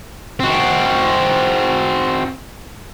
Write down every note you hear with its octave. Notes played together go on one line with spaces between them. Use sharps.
C4 F#4